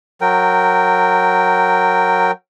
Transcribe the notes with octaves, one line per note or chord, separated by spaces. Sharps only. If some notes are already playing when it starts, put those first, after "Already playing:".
F#3 A#4 G5